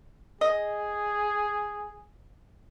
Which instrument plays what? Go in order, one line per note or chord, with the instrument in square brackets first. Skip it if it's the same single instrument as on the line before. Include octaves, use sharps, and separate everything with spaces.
[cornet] G#4 [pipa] D#5